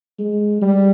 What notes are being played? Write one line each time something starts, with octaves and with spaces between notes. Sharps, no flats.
G#3
G3